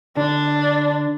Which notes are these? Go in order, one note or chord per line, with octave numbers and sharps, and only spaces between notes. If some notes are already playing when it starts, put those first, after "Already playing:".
D3 D4